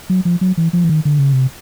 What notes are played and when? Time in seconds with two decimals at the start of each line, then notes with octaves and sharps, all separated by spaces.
0.10 F#3
0.25 F3
0.41 F#3
0.57 E3
0.73 F3
0.84 E3
0.89 D#3
1.05 D3
1.19 C#3
1.33 C3